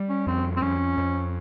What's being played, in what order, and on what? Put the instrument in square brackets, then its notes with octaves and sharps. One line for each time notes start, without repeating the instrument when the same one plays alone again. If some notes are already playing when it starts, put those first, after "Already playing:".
Already playing: [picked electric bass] G3
[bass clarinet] C#4
[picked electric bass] F2 [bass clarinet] C4
[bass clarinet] C4
[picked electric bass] F2 [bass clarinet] C#4
[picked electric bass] F2